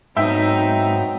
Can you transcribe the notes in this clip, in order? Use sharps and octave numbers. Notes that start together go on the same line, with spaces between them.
G#2 F#3 B3 C4 D#4 E5 G5